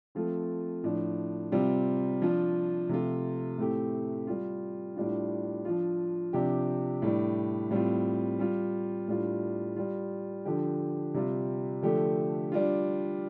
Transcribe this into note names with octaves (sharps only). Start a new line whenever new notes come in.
F3 A3 C4 F4
A2 F3 D4
C3 G3 C4 F4
F3 D4 F4
C3 F3 A3 F4
A2 A3 C4 G4
G3 F4
A2 G3 D4 F4
F3 D4 F4
C3 F3 D4 G4
A2 G3 D4
A2 G3 C4 F4
G3 F4
A2 G3 D4 F4
G3 F4
D3 F3 D4 G4
C3 G3 F4
D3 F3 A3 D4 G4
G3 D4 F4